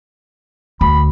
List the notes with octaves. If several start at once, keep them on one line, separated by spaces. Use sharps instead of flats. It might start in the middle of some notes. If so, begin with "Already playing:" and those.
D2 B5